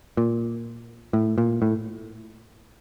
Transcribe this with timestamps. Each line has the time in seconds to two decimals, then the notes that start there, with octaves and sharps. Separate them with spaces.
0.17 A#2
1.13 A2
1.38 A#2
1.62 A2